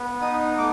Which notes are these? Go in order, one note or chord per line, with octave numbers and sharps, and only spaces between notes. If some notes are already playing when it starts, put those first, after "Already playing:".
Already playing: B3
D#4 D#6
A3 D6